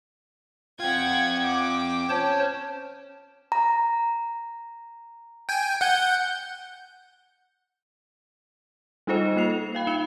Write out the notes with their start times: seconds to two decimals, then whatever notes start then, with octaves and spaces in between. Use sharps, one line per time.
0.80 C4 F4 F#5 G5 G#6
1.40 G5 D6
2.10 C#4 C5 C#5 A5
3.52 A#5
5.49 G5 G#5
5.81 F#5 G6
9.07 G3 D#4 F4 A4 C5 D#5
9.36 A#3 F4 C7 F7
9.75 F5 G5 B5
9.87 D#4 B5 C#7 E7 G7